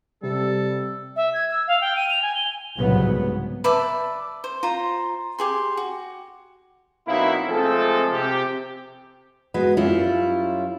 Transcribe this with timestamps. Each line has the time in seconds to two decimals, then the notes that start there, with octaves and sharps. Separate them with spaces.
0.23 C3 G3 A4
1.16 E5
1.34 G#6
1.50 E6
1.67 F5
1.81 G5
1.96 D#7
2.10 F7
2.22 G#5
2.35 G7
2.77 C2 G#2 C#3 F#3 B3
3.64 B4 D5 E5 A5
4.44 C5
4.63 F4 C5 A#5
5.39 G4 G#4 C6
5.77 F#4
7.07 B2 F#3 A#3 C4 D#4 E4
7.48 F3 G#3 A3 C4 G#4 A4
8.12 C3 G4
9.54 G#3 B3 F#4 B4
9.77 F#2 G3 C#4 E4 F4